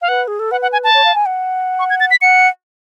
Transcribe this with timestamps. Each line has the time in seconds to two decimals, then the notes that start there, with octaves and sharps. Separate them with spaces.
0.02 F5
0.08 B4 F#5
0.28 G#4
0.39 A4
0.51 B4 F#5
0.62 F#5
0.72 G#5
0.84 A5
0.94 C#5
1.05 F5
1.15 G#5
1.26 F#5
1.79 C#6
1.90 G#6
2.00 A6
2.11 B6
2.22 F#5 C#7